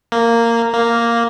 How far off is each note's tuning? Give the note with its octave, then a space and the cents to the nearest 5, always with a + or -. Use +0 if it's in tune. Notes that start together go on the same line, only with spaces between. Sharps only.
A#3 -10
A#3 +0